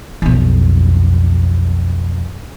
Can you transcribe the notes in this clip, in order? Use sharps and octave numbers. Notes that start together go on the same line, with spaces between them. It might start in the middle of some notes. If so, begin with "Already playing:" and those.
B1 F2